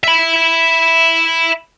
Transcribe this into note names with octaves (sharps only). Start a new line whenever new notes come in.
E5 B5